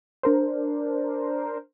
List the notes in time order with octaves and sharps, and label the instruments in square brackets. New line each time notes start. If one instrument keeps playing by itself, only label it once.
[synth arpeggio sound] D4 A#4 C5